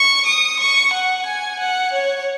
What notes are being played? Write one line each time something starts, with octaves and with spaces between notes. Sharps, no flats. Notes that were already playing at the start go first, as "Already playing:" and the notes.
Already playing: C#6
D#6
C#6
F#5
G#5
F#5
C#5